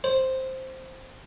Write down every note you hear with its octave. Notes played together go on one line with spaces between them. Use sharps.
C5